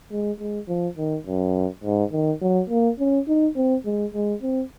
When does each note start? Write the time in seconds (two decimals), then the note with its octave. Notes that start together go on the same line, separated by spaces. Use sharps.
0.11 G#3
0.40 G#3
0.68 F3
0.97 D#3
1.26 F#2
1.84 G#2
2.12 D#3
2.42 F#3
2.70 A#3
2.99 C#4
3.28 D#4
3.56 C4
3.85 G#3
4.14 G#3
4.42 C4